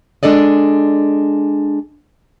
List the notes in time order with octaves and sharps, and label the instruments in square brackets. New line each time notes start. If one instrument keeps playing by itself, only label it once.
[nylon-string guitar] G#3 D4 A4 D5 D#5